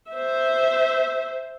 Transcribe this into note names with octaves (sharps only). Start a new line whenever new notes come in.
C5 E5